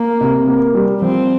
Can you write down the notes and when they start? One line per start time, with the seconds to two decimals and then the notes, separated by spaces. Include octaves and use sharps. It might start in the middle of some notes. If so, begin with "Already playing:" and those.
Already playing: A#3
0.21 C3
0.48 A#3
0.74 G3
1.01 F3 C4